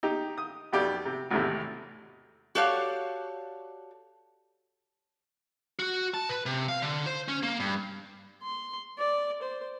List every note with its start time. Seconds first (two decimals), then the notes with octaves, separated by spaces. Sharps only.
0.03 D#4 G4
0.38 D#6
0.73 B1 F2 G4 D5
1.05 C3
1.30 G#1 E2 A2 C3
2.55 F#4 G4 A4 C#5 D5 F5
5.79 F#4
6.14 A5
6.29 B4
6.46 C3
6.68 F5
6.82 D3
7.06 C5
7.28 C#4
7.43 A#3
7.60 G2
8.43 C6
8.98 D5
9.42 C5